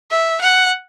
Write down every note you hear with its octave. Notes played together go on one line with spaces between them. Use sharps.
E5
F#5